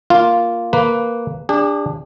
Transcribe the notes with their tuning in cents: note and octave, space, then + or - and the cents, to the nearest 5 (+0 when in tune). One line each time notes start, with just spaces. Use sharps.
A#3 +0 F4 +0
A#3 +0 B4 +0
D4 +0 G#4 -45